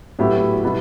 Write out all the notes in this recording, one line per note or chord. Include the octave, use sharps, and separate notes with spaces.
A2 F#3 B3 E4 G4
B2 G3 B3 E4